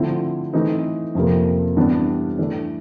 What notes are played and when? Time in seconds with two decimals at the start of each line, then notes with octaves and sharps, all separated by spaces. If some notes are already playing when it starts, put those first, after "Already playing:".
Already playing: D3 F3 A3 C4 E4
0.53 E3 A3 C4 D#4
1.15 F2 C3 F3 A#3
1.77 G2 E3 G3 B3 D4
2.39 E3 A3 D4